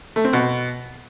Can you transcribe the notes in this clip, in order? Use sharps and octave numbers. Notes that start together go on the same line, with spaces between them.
A3
C4
B2